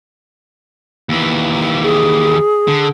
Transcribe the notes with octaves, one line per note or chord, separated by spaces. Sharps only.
D#2 E3
G#4
D3